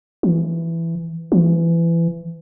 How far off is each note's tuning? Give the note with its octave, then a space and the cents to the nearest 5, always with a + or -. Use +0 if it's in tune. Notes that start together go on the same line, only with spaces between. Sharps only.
E3 +10
E3 +25